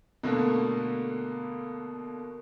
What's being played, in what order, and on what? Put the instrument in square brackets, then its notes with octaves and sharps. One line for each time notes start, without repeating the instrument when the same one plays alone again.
[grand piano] B2 D3 A3 A#3